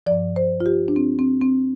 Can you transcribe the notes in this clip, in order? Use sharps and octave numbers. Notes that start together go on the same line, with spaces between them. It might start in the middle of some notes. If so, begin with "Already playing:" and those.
G2 F3 D5
C5
F4
G4
D4
C4
C4
C4